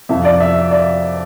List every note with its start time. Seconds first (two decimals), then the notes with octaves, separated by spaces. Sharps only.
0.09 F2 C3 F3 E5
0.25 D5
0.40 E5
0.71 D5